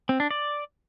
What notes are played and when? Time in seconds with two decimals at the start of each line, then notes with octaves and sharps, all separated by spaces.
0.09 C4
0.20 D4
0.31 D5